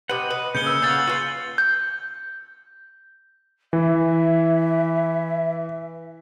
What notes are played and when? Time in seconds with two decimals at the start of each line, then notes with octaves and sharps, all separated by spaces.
0.09 C3 B4 D#5 F#5
0.30 B4
0.55 C#3 A#3 G#4 G6 C#7 G7
0.67 E6
0.82 C#3 F5 F#5 G6 A6
1.07 F4 F#4 B4 C6
1.58 G6
3.73 E3 E5